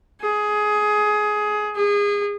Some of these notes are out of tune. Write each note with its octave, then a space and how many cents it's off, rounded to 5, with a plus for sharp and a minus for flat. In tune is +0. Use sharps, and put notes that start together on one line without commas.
G#4 +15
G#4 -25